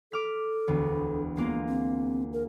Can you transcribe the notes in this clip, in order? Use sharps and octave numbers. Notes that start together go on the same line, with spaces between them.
A4 D6 F6 B6
E1 D2 B3
G#3 A#3 B3 F4
C4
A#4